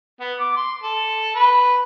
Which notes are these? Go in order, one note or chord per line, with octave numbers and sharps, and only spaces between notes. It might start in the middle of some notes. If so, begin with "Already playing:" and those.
B3
D6
C6
A4
B4